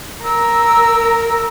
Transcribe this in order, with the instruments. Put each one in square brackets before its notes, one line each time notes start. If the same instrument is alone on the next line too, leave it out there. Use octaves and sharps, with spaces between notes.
[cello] A#4 [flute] E6